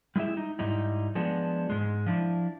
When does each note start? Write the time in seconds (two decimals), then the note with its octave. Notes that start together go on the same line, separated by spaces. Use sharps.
0.16 G3 G#3 E4 G4 E5
0.37 D#4
0.59 G#2 G3 D#4 E4
1.15 F3 G#3 B3 D4
1.70 G#2 G#3
2.06 F3 D4 E4